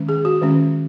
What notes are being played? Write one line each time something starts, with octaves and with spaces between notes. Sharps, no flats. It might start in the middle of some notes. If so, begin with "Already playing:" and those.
Already playing: D#3 G#3 C#4
G#4
F#4
D#3 G#3 C#4